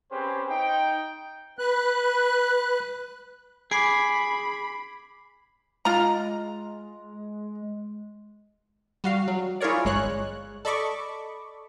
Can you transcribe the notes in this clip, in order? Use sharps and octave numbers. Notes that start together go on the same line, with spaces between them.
C4 C#4 G4 G#4 B4 C5
D#4 G5
B4 F#6
G#4 B5 D6 C7 D7
G#3 F4 A#5
G3 F#4 F5
F#3
E4 F4 G#4 A#4 C#5 D5
G1 G#3 C#5 F#6
A4 D5 D#5 B5 C#6 D6